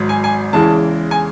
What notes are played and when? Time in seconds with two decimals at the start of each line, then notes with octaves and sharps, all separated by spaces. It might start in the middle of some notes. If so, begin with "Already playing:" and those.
Already playing: G#1 G#2 F#3
0.09 G#5
0.24 G#5
0.53 E2 C#3 E3 G#3 A5
1.11 G#5